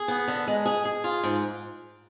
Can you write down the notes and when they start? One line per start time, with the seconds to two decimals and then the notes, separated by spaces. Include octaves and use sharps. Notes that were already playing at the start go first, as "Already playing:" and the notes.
Already playing: G#4
0.08 B3
0.28 D3
0.47 G#3
0.66 G#4
0.85 G#4
1.04 F4
1.24 G#2